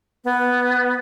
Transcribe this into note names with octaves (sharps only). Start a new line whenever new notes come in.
B3